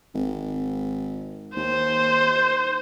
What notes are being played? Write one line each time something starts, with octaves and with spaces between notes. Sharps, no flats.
G#1
D#2 C5